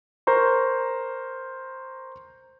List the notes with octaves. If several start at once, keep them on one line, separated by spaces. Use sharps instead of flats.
A#4 C5 A#5 C#6